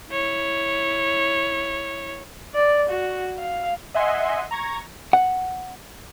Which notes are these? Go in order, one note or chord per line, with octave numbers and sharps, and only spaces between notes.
E4 C#5
D5
F#4
F5
D#5 E5 F#5 G#5 C6
A#5 C#6 G#6 A#6
F#5